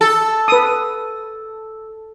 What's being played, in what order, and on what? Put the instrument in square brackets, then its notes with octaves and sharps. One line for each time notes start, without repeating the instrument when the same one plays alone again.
[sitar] A4
[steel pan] B4 D#6